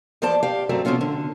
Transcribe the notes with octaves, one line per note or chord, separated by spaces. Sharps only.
E2 F3 C5 D5 A5
G4 F5
F#2 F#3 A3 C4
B2 F3 C4 C#4 F4
D3